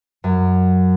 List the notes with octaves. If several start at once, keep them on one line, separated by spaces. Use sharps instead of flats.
F#2